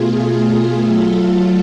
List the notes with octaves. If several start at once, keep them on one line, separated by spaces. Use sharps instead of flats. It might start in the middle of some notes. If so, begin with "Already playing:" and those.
Already playing: B2 A3 F4 G#4
F#3 A3 F4 A4